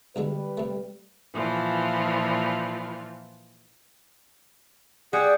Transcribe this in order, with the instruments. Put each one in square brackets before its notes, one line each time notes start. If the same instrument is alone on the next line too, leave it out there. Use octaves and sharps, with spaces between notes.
[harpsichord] B1 D3 G#3 [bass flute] G3 [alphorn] B4
[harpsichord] C3 A3
[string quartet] A#2 E3 F3 F4
[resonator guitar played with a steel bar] G3 [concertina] G#4 F#5